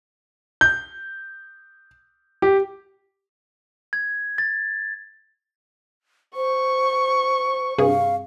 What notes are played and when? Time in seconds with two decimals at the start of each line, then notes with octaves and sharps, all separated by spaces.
0.61 G6
2.42 G4
3.93 G#6
4.38 A6
6.36 C5 C#6
7.78 G2 C3 G#4 F5